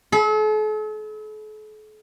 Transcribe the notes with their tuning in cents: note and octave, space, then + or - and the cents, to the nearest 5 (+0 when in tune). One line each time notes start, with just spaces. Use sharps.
A4 -45 B5 +0